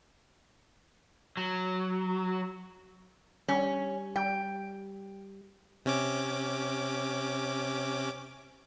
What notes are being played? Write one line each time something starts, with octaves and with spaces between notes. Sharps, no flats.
F#3
G3 C#4
G3 G5
C3 C#4 D6